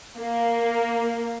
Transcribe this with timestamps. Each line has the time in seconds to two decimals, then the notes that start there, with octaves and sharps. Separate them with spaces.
0.19 A#3